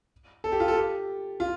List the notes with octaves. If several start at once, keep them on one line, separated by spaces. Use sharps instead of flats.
A4
G4
F4
A4
G4
F4